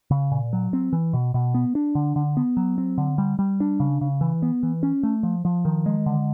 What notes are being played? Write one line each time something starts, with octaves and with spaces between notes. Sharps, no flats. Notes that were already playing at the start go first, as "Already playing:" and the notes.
C#3
A#2
F#3
C4
E3
B2
B2
B3
D4
D3
D3
B3
F#3
C4
D3
G3
G3
D4
C#3
C#3
E3
B3
E3
C#4
A3
F3
F3
D#3
G#3
D3